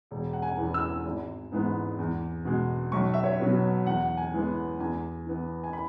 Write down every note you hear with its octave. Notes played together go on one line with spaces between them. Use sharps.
E1
F#5
G#5
E2 E3 B3
E6
G#1
G#2 E3 G#3 B3
E2
B2 G#3
B1 C#6
E5
C#5
B2 F#3 B3
E2 F#5
G#5
E3 G#3 B3
E2 G#5
E3 B3
G#5
B5